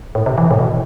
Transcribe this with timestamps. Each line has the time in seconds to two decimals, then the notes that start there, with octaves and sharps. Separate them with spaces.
0.15 A2
0.26 C3
0.38 E3
0.51 A2
0.59 B2